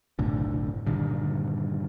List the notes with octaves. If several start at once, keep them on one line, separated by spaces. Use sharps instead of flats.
F#1 B1 A2 D3
G2 A#2 D3 D#3